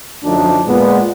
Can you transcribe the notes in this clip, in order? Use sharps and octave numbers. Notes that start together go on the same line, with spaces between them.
F#2 D3 F3 A3 D4 D#4
A#2 G#3 B3